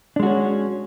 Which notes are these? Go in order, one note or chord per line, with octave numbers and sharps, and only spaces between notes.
G#3 C#4 D4 F#4